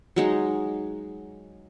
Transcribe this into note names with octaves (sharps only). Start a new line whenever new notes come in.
F#3 G#3 D#4